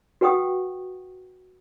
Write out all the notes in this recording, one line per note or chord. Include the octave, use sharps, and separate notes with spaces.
F#4 B4 F#5 G5 C#6 D#6